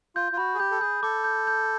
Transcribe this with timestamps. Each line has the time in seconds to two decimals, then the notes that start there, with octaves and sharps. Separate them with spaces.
0.16 F4 G6
0.32 F4
0.37 F#4 B5
0.55 G#4
0.59 G4 G6
0.71 A4
0.81 G#4 G6
1.03 A4 D6
1.24 G6
1.47 G6